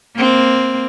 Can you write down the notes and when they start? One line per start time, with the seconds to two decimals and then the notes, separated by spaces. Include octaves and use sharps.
0.16 A#3 C4